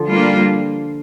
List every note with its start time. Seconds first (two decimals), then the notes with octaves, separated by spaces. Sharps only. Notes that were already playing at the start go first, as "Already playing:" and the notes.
Already playing: D3 F3
0.08 G3 A#3 D4 F4